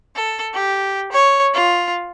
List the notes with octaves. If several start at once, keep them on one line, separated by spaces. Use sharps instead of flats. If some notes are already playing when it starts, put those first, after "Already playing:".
A4
G4
C#5
F4